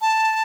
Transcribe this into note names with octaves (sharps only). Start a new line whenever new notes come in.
A5